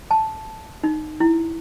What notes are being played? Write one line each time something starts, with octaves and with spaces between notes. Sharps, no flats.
A5
D#4
E4